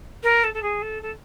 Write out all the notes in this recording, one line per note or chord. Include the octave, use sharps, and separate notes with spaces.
A#4
A4
A4
G#4
A4
A4